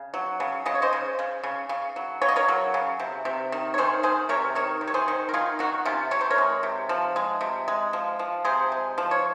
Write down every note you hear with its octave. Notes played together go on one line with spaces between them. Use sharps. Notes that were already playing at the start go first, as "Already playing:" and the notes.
Already playing: C#3
F#3
C#3
C#3 D#5
C#5
C5 D#5
C#3
C#3
C#3
C#3
F#3
C#3 C#5
D#5
A#4 C#5
F#3
C#3
C3
C3
D#3
C#5
D#3 G#4 C5
D#3 G#4 C5
C3 A#4 C#5
D#3 A#4 C#5
C3
C#5
G#4 C5
D#3
A#4
D#3 F4 G#4
D#3 D#4 F#4
C3 C#4 F4
C3 C#5
C5
A#4 C#5
G#3
C3
F3
G#3
C3
G#3
F3
F3
C3 G#4 C5
G#3
F3
C#5